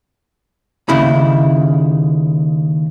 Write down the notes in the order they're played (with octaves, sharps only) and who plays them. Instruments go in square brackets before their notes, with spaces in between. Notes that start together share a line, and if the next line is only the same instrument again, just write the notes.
[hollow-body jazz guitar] D#2 C#3 E4 B5